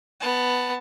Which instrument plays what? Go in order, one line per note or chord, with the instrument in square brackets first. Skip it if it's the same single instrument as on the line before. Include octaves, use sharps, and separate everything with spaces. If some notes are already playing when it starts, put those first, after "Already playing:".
[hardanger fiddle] B3 A5